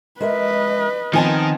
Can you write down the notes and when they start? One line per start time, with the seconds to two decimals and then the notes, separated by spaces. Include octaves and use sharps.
0.20 G#3 A#4 B4 D#5 E5
1.13 D#3 F3 B3 C4 D#4 G#5 A5